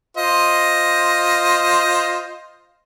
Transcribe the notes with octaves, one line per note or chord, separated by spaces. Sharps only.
F4 C5 D#5